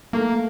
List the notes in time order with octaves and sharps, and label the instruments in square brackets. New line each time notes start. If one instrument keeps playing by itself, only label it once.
[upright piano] A3 [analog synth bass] A#3